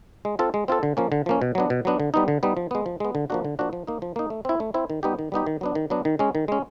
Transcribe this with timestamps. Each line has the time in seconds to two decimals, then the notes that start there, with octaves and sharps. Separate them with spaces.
0.25 G#3
0.39 C4 F4 A4
0.54 G#3
0.68 C4 F4 A4
0.83 D3
0.97 F3 A#3 C#4
1.12 D3
1.26 F3 A#3 C#4
1.42 B2
1.55 F#3 B3 D4
1.70 B2
1.85 F#3 B3 D4
2.00 D3
2.14 G3 B3 D#4
2.28 D3
2.43 G3 B3 D#4
2.57 F3
2.71 G#3 B3
2.86 F3
3.00 G#3 B3
3.15 D3
3.30 F3 A#3 D4 F#4
3.45 D3
3.59 F3 A#3 D4 F#4
3.73 F3
3.87 A#3 D#4
4.02 F3
4.16 A#3 D#4
4.30 A3
4.45 C4 E4
4.60 A3
4.74 C4 E4
4.90 D#3
5.03 G3 B3 D#4 G4
5.19 D#3
5.32 G3 B3 D#4 G4
5.46 D#3
5.61 F#3 B3 D4
5.75 D#3
5.90 F#3 B3 D4
6.05 D#3
6.19 G#3 C#4
6.35 D#3
6.48 G#3 C#4